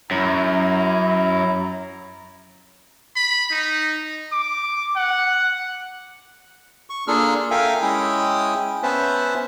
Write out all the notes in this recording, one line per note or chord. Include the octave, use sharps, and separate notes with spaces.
F#2 E4 A#5
B5
D#4
D6
F#5
C#6
A#3 D4 F4 G#4 A4 F6
A4 A#4 E5 F5 G5 G#5
G#3 C#4 E4 G5 D#6
B3 C#4 B4 C5 E5 A5